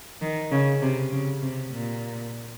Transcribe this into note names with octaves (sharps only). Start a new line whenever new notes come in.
D#3
C#3
C3
C#3
C3
A#2